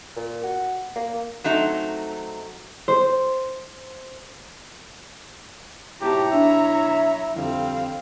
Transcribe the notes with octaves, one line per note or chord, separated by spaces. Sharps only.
A#2
F#4
A#3
F#3 A3 C4 D#4
C5
G#2 B2 E4 G4 C#5 A5 A#5
B1 D4 E5
F2 D3 G3 C4 F5